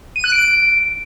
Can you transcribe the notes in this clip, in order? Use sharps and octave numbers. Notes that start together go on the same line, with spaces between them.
D#7
F#6
D7